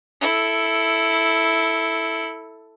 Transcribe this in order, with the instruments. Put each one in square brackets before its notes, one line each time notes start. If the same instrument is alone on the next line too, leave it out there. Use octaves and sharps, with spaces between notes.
[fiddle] E4 A4